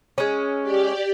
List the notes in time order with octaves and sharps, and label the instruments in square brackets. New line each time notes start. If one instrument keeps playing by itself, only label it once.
[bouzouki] G#3 C#4
[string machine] G4 D5